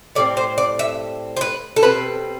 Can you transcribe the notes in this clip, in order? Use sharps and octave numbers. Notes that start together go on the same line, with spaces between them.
A2 G3 C4 D5
C5
D5
E5
C5
B4
A4
B2 G3 C4 B4